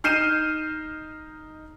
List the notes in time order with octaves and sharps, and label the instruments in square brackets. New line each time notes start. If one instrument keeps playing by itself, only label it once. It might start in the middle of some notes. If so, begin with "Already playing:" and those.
[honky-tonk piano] D#4 F6 G6 C7 D#7 E7